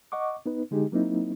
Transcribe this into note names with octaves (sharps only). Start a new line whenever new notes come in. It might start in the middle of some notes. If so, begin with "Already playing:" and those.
D#5 F#5 C#6 D6
B3 D#4 B4
D3 G#3 D#4 G4 G#4
F#3 A#3 C4 D#4 E4